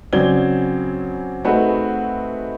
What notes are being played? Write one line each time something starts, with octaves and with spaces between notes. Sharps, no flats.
C#3 F#3 C4 D5 G#6 G7
A3 C4 D#4 F#4 G#4 B4